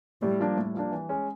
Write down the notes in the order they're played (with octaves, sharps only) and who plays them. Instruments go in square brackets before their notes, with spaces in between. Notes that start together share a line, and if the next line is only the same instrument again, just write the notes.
[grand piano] A2 [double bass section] G3
[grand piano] F3 A#3 D4
A2
F3 A#3 D4
E3
G#3 C#4